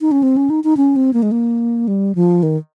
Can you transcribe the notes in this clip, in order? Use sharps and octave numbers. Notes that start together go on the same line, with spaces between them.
D#4
C#4
C4
C#4
D#4
D#4
C#4
C4
A#3
G#3
A#3
G3
F3
D#3